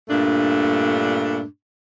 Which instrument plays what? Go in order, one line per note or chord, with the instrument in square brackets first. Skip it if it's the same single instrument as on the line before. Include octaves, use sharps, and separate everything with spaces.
[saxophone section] G2 A#2 A3 D4